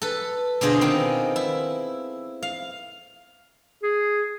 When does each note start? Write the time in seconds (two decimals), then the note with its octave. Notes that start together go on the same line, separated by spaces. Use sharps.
0.02 A4 B4
0.61 B2 D3 F4 G#4 C5 D#5
0.81 D#3 B3 C4
1.36 E4
2.43 F5
3.83 G#4